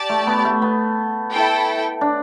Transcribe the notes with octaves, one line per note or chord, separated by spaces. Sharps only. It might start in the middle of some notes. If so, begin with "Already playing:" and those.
Already playing: G4 D5 A5
A3
B3
A3
B3
E4 A4 G5
D4